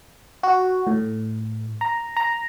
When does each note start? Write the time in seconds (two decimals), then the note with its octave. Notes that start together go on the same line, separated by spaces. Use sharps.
0.43 F#4
0.87 A2
1.81 A#5
2.17 A#5